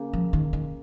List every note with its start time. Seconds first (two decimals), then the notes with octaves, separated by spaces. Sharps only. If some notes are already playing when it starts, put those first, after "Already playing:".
Already playing: C#3 A#3
0.13 F3
0.33 D#3
0.53 D#3